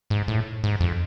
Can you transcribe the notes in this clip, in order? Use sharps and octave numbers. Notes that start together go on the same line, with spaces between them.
G#2
A2
G#2
F2